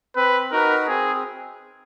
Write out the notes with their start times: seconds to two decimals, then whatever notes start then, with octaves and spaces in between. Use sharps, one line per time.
0.16 C4 B4
0.52 D#4 F#4 A#4 B4
0.87 C4 G#4